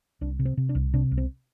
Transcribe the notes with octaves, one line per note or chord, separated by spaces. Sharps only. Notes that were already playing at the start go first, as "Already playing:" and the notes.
C2 D4
C3
C4
C3
D4
C2
C3 D4
C2
C4